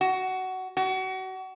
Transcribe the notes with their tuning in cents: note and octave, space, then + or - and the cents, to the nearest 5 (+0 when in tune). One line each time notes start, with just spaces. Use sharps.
F#4 +15
F#4 +30